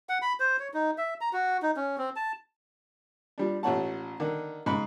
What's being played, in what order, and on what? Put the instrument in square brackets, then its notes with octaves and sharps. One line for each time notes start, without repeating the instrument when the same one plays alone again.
[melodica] F#5
B5
C5
C#5
D#4
E5
A#5
F#4
D#4
C#4
C4
A5
[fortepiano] F3 G3 D4
A1 F3 A3 C#5 F#5 A5
D3 D#3
G#2 C#3 B5